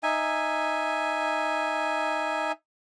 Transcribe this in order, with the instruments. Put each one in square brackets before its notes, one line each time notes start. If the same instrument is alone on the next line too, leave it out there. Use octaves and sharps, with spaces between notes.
[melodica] D#4 E5 G#5